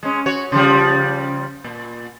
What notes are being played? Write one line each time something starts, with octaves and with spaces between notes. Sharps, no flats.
G#3 C#4
F#4 C#5
C#3 F3 G3
A#2